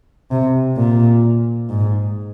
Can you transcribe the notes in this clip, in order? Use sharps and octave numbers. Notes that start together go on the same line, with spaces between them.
C3
A#2
G#2